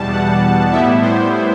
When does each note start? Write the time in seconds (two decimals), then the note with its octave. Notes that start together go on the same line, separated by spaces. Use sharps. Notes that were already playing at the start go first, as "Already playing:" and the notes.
Already playing: E2 B2 G3 A5
0.13 F#5
0.72 A2 G3 B3 E4 E5
1.02 C5